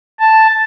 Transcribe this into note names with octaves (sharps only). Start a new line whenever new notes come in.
A5